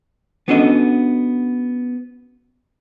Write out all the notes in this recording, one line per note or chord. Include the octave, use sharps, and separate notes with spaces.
B3 C#4 D4 F#4 A4 D#5